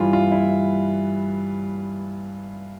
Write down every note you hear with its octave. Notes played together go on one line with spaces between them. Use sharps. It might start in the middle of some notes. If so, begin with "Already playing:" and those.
Already playing: G2 E3 E4 F4
F4
E4